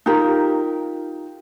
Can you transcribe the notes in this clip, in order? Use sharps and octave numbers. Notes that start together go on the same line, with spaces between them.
D#4 F4 G4 A#4